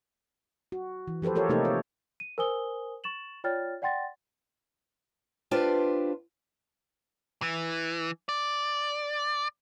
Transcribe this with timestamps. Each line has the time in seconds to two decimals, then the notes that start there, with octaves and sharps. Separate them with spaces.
0.72 F#4
1.08 E3
1.22 F3 G4 A4 B4 C5
1.35 F4 G4 A4 A#4 C#5
1.49 C3 A3 A#3 D#4 G4 A4
1.65 C#5
2.20 D#7
2.38 A#4 C5 G#5 D#6 G7
3.04 C#6 A6 E7 F#7
3.44 F4 C#5 D5 G5 F6 A6
3.82 D5 F#5 G5 C6 A6 A#6
5.51 D4 F4 G4 B4 C5
7.42 E3
8.29 D5